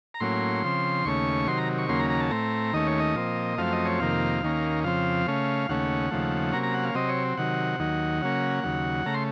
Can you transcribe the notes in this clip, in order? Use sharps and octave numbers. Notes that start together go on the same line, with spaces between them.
A#5
A2 F#3 A#3 C#4 C6
C#3 F3 C4
D#2 C#3 A3 C#4 C#6
C3 D#3 F#3 C6
A#5
C#6
D#2 C#3 F#3 A#3 C#4 C6
A#5
A#5
A5
A2 A3 C4 A#5
D#2 D#3 A3 C#4 D#5
C#5
D#5
A#2 F3 C4
F#2 F3 A3 C4 F5
D#5
C#5
F2 C3 D#3 A#3 F5
D#2 D#3 A#3 C#4
F2 C#3 F3 C4 F5
C#3 A3 C#4
D#2 C#3 A3 C#4 F#5
D#2 C#3 F3 A3
C3 F#3 A#3 C#4 A#5
A#5
F#5
F5
C3 F#3 C4 D#5
C#5
C3 D#3 F#3 F#5
D#2 D#3 F#3
C#3 F#3 A#3 C#4
D#2 C#3 F#3
C#3 A3 A#5
C6